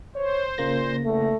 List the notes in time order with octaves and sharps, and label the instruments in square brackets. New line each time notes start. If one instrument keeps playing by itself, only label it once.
[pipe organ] C5 [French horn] C#5
[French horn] A#2 [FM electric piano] C#3 A#3 A#6
[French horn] E2 [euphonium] A3